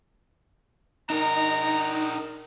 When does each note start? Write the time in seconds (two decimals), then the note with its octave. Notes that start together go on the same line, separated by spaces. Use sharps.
1.10 D4 D#4 A#4 A#5